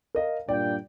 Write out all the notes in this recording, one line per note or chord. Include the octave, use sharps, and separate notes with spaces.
A#4 D#5 F5
G2 A#2 D5 G5